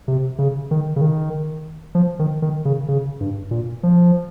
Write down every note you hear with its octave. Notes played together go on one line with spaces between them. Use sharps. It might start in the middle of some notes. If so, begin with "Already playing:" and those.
C3
C#3
D#3
C#3
D#3
F3
D#3
D#3
C#3
C#3
G2
A#2
F3